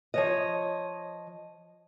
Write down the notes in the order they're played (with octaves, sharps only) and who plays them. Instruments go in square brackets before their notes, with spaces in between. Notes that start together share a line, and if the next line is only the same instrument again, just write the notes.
[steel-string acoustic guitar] F3 C#5 D#5